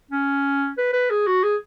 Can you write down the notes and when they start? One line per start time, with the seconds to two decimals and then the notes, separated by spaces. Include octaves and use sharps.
0.11 C#4
0.77 B4
0.93 B4
1.10 G#4
1.27 F#4
1.43 G#4